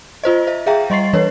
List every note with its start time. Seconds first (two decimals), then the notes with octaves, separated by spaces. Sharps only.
0.23 F4 C5 D#5
0.47 C5 E5
0.66 G#4 E5 F5 G5 A#5
0.90 G3 D#5 C6 C#6 A6 C7
1.13 E3 B4 C#5